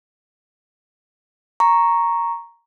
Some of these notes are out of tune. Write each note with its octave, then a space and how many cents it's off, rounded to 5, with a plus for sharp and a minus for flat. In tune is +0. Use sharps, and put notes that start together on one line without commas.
A#5 +0 C#6 +0